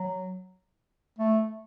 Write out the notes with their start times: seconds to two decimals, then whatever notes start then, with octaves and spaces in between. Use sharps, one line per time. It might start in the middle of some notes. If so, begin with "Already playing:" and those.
Already playing: F#3
1.19 A3